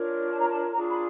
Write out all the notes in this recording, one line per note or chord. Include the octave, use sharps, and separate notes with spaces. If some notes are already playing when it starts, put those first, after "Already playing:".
Already playing: D4 F4 A#4 C#5
A5
A#5
A5
D4 F4 G#4 A#5
B5